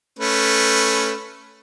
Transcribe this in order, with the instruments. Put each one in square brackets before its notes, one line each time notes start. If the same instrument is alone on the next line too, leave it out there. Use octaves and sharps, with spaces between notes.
[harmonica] A3 C#4 B4